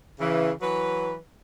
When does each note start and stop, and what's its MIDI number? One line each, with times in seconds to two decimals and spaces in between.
0.20 0.52 49
0.20 0.52 52
0.62 1.17 52
0.62 1.17 54
0.62 1.17 71